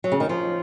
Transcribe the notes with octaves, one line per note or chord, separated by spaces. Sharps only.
F#3
C#3
D#3
F3